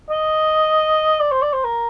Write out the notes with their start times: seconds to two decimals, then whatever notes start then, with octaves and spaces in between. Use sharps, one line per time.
0.10 D#5
1.20 D5
1.32 C5
1.42 D5
1.53 C5
1.64 A#4